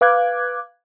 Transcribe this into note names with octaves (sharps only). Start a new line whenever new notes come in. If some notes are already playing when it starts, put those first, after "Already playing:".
B4 F5 D6 F#6 G#6